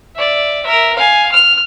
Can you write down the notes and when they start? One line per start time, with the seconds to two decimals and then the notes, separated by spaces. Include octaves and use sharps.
0.15 D5 E5
0.63 A#4 E5
0.95 F5 G#5
1.32 F6